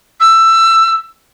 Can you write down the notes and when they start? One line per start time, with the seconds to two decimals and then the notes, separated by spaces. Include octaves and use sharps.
0.20 E6